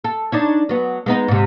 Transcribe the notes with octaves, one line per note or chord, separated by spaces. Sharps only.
A4
D4 D#4 C#5
F#3 B3
G#3 B3 D#4
G#2 C3